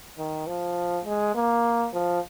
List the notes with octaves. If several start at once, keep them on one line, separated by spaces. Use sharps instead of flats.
D#3
F3
G#3
A#3
F3